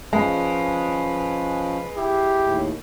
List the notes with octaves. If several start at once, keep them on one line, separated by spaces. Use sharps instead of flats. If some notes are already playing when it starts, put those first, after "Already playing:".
F3 G#3 C#4 B4
E4 G4
D#2 A2